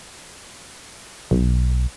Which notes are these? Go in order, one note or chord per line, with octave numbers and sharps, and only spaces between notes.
B1